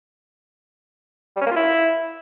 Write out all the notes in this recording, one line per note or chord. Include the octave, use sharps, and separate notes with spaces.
G3
C#4
A#3
F4
E4